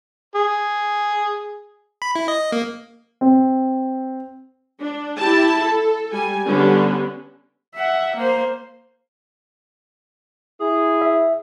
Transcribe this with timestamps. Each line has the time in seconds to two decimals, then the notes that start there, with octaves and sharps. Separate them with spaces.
0.36 G#4
2.02 B5
2.16 E4
2.28 D#5
2.52 A#3
3.21 C4
4.81 D4
5.18 E4 G4 A5
5.62 A4
6.12 G3 G#5
6.47 D3 G3 B3 C#4
7.75 E5 F#5
8.16 A#3 C5
10.60 E4 G#4
11.02 E5